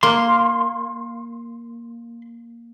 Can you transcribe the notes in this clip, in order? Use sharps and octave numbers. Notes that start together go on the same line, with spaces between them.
A#3 C6